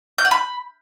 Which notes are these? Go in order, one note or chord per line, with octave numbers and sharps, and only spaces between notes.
G6
F#5
B5